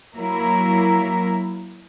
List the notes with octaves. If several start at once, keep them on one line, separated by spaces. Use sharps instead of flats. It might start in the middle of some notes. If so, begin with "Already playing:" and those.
F#3 A#3 E4 A#4